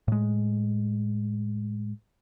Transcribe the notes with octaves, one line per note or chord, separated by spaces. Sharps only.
A2 G#3